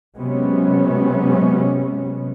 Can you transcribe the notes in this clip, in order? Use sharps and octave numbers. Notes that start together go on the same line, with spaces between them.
C3 F#3 G#3 B3 C#4